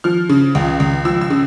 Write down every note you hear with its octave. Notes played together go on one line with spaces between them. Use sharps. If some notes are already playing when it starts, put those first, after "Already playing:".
F3 F6
C#3
C#2
C#2
F3 E6
E6
C#3